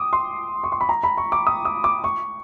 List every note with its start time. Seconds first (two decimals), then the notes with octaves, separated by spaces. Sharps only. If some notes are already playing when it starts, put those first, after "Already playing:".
Already playing: D6 D#6
0.13 C6
0.64 C#6
0.72 C6
0.81 B5
0.89 A#5
1.04 B5
1.17 C#6
1.32 D6
1.47 D#6
1.65 D#6
1.84 D6
2.04 C#6